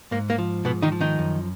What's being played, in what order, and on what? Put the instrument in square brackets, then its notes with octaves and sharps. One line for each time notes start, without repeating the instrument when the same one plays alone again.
[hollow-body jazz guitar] G#2 A#3
A#3
F3
G#2 B2 B3
D#3 D#4
F3
D#3 D#4
F#2